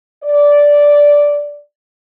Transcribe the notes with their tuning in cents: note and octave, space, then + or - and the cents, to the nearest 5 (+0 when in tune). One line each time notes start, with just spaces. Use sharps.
D5 -10